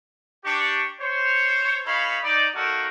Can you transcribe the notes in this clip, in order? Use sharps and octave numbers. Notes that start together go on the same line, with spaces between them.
D4 G4 C#6
C5 C#5
D#4 A4 C#5 F5 B5
D#4 D5
A3 A#3 D#4 F#4 A4 A#4